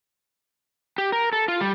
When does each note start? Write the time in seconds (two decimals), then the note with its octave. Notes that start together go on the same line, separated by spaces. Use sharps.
0.98 G4
1.12 A#4
1.33 A4
1.48 F4
1.61 G3